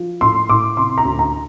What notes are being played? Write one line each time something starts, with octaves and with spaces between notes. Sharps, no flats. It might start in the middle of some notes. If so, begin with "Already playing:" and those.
Already playing: F3
A2 C6
A2 D6
C3 C6
A#5
D2
A#5